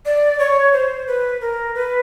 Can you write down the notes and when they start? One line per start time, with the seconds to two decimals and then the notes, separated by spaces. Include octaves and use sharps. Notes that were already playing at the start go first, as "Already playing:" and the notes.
0.06 D5
0.39 C#5
0.73 C5
1.07 B4
1.41 A#4
1.75 B4